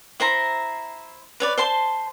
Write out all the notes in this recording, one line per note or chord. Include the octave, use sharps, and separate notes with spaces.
E4 C5 A#5
B4 C#5 D5
C5 A5 C6